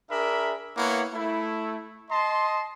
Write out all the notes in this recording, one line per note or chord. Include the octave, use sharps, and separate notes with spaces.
D4 G#4 A#4 E5 B5
A#3 B3 E4 C#5 F#5
A3 E4
D#5 A5 C6